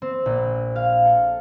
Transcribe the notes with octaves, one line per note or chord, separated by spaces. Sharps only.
C4
A#1
F5
A4